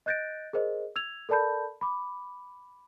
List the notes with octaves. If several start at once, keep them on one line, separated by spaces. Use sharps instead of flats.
D#5 F#6 G6 A6 A#6 D7
G#4 A#4 C5 D#5
E6 G#6 F7
A4 A#4 D5 A5 B5 G6
B5 D6